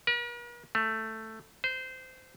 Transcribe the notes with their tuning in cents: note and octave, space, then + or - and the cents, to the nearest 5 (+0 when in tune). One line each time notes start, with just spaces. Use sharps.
A#4 +45
A3 +5
C5 -20